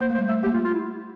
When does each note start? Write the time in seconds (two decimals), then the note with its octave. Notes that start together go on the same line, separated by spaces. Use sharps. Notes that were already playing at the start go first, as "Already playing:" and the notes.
0.01 A#3 C5
0.10 A3
0.14 C5
0.18 G3
0.28 A3 E5
0.43 A#3 G4
0.54 F4
0.64 F4
0.74 E4